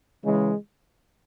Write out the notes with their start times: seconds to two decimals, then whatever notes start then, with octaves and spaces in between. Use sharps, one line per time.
0.24 C#3 E3 G#3